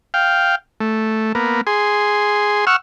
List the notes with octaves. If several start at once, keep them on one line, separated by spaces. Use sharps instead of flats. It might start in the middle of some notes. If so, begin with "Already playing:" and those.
F5 G5
A3
A#3 B3
G#4 C6
F#5 C#6 E6 F6